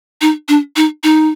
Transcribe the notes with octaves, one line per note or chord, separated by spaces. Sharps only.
D#4
D4
D#4
D#4